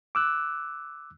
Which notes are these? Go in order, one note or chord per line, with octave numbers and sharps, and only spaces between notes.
D6 E6 F#6